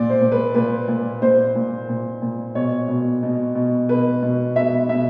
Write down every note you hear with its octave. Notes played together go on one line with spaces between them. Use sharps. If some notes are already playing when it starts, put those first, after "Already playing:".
Already playing: A#2 D5
C5
A#2
B4
A#2 B4
A#2
A#2 C5
A#2
A#2
A#2
B2 C#5
B2
B2
B2
B2 B4
B2
B2 E5
B2 E5